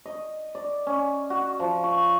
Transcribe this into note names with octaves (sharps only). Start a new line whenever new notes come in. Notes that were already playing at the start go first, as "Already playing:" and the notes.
D#5
D5
C#4
F#4
F3
C#6